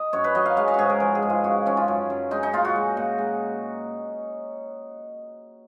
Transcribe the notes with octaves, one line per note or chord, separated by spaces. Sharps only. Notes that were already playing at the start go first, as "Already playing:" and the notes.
Already playing: D#5
F#2 C#5
B4
F#3 D#5
F5
G#3 F5
D#5
G#2 F#4 G#4
A#4
F3 A#4
G#4
G#2
F4
C#3 F#4
F3 C#4
F4
F#2
F#2
G#3 D#4
D#4
A#2 F4
F#4
G#3
A#2
G#3